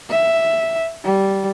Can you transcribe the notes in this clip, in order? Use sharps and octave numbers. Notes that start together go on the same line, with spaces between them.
E5
G3